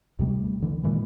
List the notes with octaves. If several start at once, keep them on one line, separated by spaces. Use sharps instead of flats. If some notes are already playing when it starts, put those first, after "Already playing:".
D#2 C3 G3 A3
D3 E3
A#2 D#3 E3 G#3